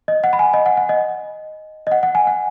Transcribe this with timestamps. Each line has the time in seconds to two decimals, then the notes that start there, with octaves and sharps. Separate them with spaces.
0.08 D#5
0.24 F#5
0.33 B5
0.39 G#5
0.54 D#5
0.66 F#5
0.77 F#5
0.89 D#5
1.87 D#5
1.92 F#5
2.03 F#5
2.15 G#5
2.27 F#5